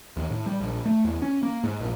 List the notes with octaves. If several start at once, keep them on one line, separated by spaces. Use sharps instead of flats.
D#2
A2
G3
A#1
A3
E2
C#4
A#3
G#2
A#1